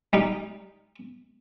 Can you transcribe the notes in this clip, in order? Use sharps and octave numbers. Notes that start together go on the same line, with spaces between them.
G3 D#4